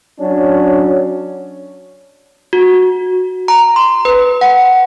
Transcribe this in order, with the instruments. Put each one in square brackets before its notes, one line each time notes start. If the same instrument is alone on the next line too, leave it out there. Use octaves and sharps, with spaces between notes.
[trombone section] F#3 C#4 D4
[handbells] F#4
A#5
C6
B4
F#5